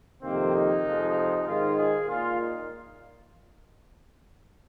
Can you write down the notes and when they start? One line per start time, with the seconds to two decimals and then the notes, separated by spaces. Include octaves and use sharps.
0.22 F2 C3 D#3 A#3 C4
0.53 D#4
0.85 F2 C3 F3 G#3
1.46 G#2 D#3 G#3 F4
1.77 G#4
2.08 A#2 A#3 F4
2.39 D#4